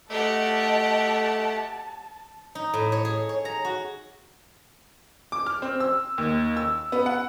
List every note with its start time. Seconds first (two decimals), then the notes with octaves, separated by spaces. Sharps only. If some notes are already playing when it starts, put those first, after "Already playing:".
0.10 A3 G4 D#5 F#5 A5
2.55 D#4
2.74 A2
2.92 C#5
3.05 G#4
3.29 C#5
3.45 A#5
3.65 F#4
5.32 D6
5.46 F6
5.62 C4
5.80 E6
6.18 D#2
6.57 E6
6.92 B3
7.06 F#5